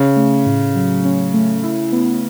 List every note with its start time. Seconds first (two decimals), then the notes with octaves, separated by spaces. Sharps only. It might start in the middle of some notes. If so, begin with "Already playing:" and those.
Already playing: C#3 C#4
0.16 A3
0.46 A2
0.75 F#3
1.05 C#4
1.34 A3
1.63 E4
1.92 B3